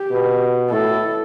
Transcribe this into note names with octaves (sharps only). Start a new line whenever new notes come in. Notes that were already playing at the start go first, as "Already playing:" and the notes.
Already playing: G4
B2
A2 A4